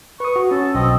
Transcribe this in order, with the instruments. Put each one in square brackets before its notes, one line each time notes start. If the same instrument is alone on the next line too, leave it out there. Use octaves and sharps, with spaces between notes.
[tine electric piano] B4 D#6 [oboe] C#6
[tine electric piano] F#4
[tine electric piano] C#4 [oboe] A4
[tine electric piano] B1 [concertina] C4 [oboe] D#5